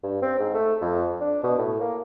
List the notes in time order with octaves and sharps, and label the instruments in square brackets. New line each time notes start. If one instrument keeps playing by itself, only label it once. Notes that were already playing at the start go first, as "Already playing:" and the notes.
[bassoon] G2
C4
G#2
A3
F2
D4
B2
A2
A#3